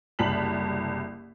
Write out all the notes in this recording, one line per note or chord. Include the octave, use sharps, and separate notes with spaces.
F#1 C2 A5 B6 F#7